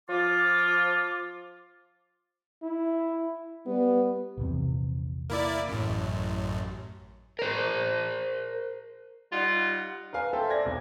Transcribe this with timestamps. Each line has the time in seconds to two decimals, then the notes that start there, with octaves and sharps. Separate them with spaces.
0.09 F3 F4 D6
2.63 E4
3.66 G3 B3
4.37 A#1 E2 C3
5.30 A#3 E4 D5
5.68 A1 F#2
7.39 A#4 C5
9.32 G3 D#4 F4 F#5
10.13 A#4 B4 F5 G#5
10.33 A4 C5 E5 G5 G#5
10.50 D5 G#6 A#6
10.65 B1 E2